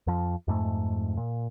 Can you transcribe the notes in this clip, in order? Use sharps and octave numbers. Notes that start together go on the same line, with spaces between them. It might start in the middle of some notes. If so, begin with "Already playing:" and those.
F2 F3
F2 G#2 A3
A#2